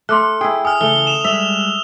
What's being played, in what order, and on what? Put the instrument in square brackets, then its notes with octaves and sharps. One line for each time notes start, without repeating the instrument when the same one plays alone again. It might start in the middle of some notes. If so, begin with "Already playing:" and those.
[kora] A3 [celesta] C6 D6 F#6 [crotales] F6
[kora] E4 G#4 [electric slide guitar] G5
[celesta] G#5 [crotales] D#6 F6
[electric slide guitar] C#3 E3 [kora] A3 [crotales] G7
[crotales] E7 F7
[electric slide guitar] G3 G#3 [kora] E5 [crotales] E6 F7 [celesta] G7